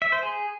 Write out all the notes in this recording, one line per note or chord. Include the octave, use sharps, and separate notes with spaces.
E5
C5
G#4